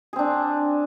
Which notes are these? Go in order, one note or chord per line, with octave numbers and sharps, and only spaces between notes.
C4 D4 G#4